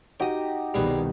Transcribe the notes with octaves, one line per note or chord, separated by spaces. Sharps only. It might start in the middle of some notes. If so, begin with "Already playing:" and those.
D#4 F#4 G4 G5 D#6
C2 B2 D#3 G3 G#4 B4